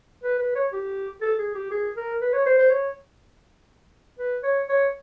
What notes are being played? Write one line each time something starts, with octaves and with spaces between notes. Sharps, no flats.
B4
B4
C#5
G4
A4
G#4
G4
G#4
A#4
B4
C#5
C5
C5
C#5
B4
C#5
C#5